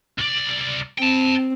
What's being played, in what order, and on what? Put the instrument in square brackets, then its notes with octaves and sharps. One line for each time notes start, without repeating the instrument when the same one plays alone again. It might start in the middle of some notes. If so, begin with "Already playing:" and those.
[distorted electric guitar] C2 D5
[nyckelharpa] C4 [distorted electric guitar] G5 A5